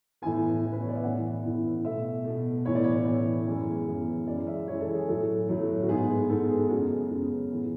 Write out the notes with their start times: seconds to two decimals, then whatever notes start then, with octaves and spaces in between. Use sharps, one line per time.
0.22 A2 E3 B3 G#5
0.62 A2 E3 B3
0.72 B4
0.81 C#5
0.88 D5
0.95 E5
1.03 A2 E3 B3 F#5
1.43 A2 E3 B3
1.84 B2 A3 E5
2.24 B2 A3
2.65 A2 E3 B3 C#5
2.75 D5
2.84 C#5
3.05 A2 E3 B3
3.47 F#2 E3 G#3 B3
3.87 F#2 E3 G#3 B3
4.26 F#2 E3 G#3 D5
4.47 E5
4.68 F#2 E3 G#3 C#5
4.80 A4
4.94 G#4
5.08 A2 F#3 A3 A4
5.48 A2 F#3 A3
5.82 F#4
5.88 G#2 G#3 B3 G#4
6.29 G#2 G#3 B3 A4
6.49 G#4
6.69 F#2 C#3 G#3 B3 F#4
7.10 F#2 C#3 G#3 B3
7.50 A2 E3 B3